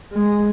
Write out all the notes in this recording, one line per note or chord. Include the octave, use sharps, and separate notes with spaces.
G#3